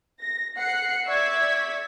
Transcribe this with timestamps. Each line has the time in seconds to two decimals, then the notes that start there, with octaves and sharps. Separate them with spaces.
0.20 A#6
0.57 F#5 F#6 C7 C#7
1.07 D5 E5 C#6 E6 G#6 B6